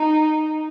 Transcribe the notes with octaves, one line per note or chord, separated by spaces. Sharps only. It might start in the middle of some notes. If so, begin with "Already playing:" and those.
Already playing: D#4